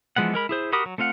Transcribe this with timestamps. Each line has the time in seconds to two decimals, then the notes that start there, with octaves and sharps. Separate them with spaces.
0.16 E3 F3 G#3 B3 F#5
0.34 G#3 A#4 B5
0.49 E4 G#4 C5
0.72 F#4 G4 A#4 B5 D#6
0.86 F#3
0.98 A3 C4 F4 F5 F#5